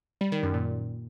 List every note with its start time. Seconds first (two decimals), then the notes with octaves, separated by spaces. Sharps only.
0.21 G3
0.32 D#3
0.43 F#2
0.54 A#2